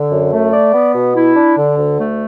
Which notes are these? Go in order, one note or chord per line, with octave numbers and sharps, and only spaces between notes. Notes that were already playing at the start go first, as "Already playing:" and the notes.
Already playing: D3
F#2
A3
D5
B3
B2
E4
D4
D3
D2
A3